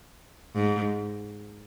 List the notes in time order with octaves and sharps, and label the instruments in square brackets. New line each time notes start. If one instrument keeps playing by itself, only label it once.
[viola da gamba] G#2